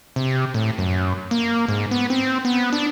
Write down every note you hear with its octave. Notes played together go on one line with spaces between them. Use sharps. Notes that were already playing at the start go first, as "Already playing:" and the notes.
C3
A2
F#2
A#3
G#2
B3
C4
B3
D4